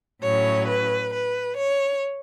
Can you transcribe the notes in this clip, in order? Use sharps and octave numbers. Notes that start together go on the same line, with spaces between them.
A2 F#3 C#4 C#5
B4
B4
C#5